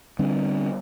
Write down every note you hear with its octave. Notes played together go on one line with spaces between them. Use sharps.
D3 G3 C4 D4